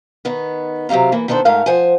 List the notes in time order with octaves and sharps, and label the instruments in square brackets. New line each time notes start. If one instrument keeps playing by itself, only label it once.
[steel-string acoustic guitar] D#3 B3
C3 F#3 G4 F5 A#5
E3 A#3
D#3 B3 D4 A4 C5
G#2 A3 A#4 F5
F3 C5 F#5 G#5